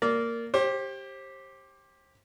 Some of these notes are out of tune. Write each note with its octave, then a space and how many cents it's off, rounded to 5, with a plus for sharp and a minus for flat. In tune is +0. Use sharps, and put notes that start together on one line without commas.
A#3 -10 D5 -20
G4 +0 C5 +35